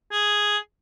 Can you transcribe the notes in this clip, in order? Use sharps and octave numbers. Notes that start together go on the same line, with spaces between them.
G#4